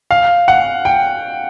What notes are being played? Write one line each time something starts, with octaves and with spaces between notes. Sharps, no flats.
F5
F#5
G5